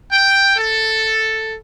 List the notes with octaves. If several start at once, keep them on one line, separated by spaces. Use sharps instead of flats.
G5
A4